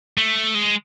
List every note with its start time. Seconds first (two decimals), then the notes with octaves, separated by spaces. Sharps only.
0.18 A3
0.55 G#3